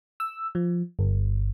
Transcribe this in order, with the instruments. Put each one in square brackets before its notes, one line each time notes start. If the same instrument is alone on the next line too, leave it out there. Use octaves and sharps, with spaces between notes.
[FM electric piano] E6
F3
G1